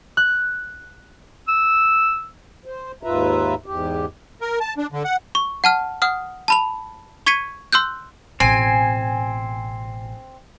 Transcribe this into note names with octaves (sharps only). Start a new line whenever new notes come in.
F#6
E6
C5
D#2 G#2 F4 B4 E5 A#5
E2 G#2 G4
A#4
A5
D4
D3
F#5
C#6
F#5 A5 F6
F#5 D#6 F6
A5 B5 F7
C#6 G#6 B6 C#7 D#7
C6 E6 F#6 G6
A1 B2 C4 G#5